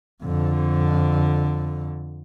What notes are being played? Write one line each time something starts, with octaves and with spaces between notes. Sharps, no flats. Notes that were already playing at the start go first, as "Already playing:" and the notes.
F2 D3